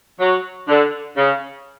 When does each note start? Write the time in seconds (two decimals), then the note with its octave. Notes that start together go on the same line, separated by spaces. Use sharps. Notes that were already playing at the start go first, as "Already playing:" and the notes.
0.20 F#3
0.68 D3
1.16 C#3